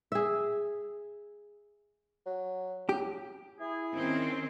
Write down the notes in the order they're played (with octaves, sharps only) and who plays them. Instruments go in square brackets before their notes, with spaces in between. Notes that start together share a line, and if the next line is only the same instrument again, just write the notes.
[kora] G#4 E5
[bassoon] F#3
[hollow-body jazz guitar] G4
[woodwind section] E4 G#4
[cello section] D#3 C4 C#4